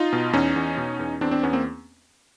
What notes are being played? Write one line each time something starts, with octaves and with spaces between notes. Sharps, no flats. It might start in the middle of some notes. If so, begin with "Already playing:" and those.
Already playing: D#4 F4
B2
E2 C#4 D#4
E2
B2
E2
E2 C4 D4
C4 D4
E2 B3 C#4
A#3 C4